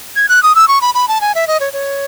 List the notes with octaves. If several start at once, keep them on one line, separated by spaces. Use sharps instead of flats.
G#6
F#6
D#6
E6
C#6
B5
B5
A5
G#5
E5
D#5
C#5
C#5